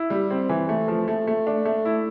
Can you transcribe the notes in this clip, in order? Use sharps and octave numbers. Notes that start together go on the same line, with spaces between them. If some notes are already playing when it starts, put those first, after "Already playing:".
Already playing: E4
G3
C4
E3
A3
F3
A3
A3
D4
A3
E4